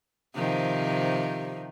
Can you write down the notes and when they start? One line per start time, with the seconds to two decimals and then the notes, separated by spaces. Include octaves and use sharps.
0.35 C3 D#3 F3